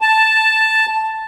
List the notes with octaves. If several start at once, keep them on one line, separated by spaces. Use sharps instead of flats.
A5